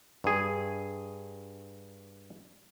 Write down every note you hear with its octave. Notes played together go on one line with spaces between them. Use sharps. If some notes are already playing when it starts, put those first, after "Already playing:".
G2 G#4